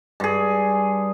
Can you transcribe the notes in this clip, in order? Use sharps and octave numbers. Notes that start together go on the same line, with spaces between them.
G2 G#4